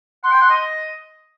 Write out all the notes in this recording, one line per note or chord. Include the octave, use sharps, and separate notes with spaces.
F#5 C6
G5
F#5
D#5